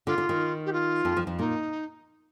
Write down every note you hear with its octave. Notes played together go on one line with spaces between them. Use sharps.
D3 F4
D3
D#3
G4
F4
F2 F3
F2 F3
F2 F3
A#2 A#3 D#4